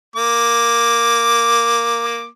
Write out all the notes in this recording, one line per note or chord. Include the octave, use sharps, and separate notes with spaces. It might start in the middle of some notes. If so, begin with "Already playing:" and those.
A#3 D6